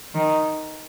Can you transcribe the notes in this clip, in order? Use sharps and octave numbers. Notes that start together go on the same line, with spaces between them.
D#3